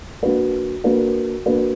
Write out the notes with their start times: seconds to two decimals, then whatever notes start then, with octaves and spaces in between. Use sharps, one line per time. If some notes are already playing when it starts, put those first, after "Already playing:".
0.23 A#3 D4 F#4 B4
0.84 A#3 D4 F#4 B4
1.46 A#3 D4 F#4 B4